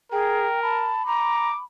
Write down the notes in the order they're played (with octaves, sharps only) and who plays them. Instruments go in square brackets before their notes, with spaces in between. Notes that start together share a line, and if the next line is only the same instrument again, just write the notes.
[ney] G#4 [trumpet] A#4 [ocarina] G5
[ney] A5 [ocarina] B5
[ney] A#5 [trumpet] D6